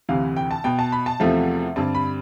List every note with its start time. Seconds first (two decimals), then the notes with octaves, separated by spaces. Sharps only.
0.09 D2 C3 E3 F5
0.36 G5
0.51 A5
0.64 B2 B3 G5
0.79 A5
0.92 B5
1.06 A5
1.20 E2 C3 F3 A3 C4 E5
1.76 G2 D3 G3 C4 A5
1.95 B5